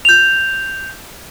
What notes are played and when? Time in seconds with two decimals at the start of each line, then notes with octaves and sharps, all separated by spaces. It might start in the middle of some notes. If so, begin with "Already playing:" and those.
0.05 G6 F7